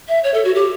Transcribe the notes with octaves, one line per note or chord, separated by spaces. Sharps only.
E5
C#5
A4
F#4
G4